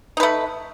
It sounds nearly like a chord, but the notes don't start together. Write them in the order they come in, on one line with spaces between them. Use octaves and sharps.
D#4 B4 A3